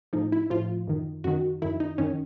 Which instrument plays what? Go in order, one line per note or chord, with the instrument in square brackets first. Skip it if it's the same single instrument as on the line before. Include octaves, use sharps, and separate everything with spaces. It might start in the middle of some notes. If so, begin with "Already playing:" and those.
[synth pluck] A2 F3 D#4
E4
A2 F3 F4
F#2 D#3
F#2 D#3 F#4
F#2 D#3 E4
D#4
F#2 D#3 C#4